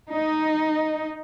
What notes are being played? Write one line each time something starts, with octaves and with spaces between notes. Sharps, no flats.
D#4